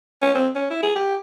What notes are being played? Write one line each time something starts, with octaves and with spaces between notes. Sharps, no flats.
C#4
C4
C#4
E4
G#4
G4